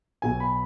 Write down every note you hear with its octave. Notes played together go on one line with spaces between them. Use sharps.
B1 B2 G#5
B5